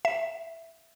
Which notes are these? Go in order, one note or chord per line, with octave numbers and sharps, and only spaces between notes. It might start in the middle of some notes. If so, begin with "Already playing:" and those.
E5